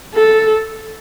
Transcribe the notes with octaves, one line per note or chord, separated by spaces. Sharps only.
A4